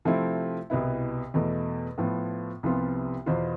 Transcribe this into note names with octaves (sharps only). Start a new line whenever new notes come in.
C3 F3 A3 C4 E4
C2 B2 B3 E4
E2 B2 A3
A2 F3 B3
C2 C3 F3 B3 F4
E2 B2 B3 F4 C5